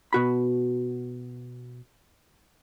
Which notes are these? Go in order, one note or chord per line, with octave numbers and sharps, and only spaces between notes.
B2 F#4 B5